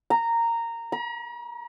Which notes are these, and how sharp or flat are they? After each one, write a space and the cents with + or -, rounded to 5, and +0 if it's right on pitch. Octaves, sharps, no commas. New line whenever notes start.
A#5 -10
A#5 +45